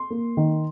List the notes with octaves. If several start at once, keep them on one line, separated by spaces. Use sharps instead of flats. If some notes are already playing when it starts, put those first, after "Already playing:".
Already playing: C6
A#3
D#3